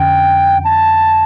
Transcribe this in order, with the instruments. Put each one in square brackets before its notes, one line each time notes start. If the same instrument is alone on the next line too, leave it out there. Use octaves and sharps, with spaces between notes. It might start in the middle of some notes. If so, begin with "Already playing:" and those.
Already playing: [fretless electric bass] F2 D3 C#4 [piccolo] G5
[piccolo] A5